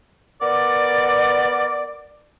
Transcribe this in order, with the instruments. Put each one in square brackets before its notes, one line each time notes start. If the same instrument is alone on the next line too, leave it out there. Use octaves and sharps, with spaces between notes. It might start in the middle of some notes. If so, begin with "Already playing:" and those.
[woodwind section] B3 A#4 D5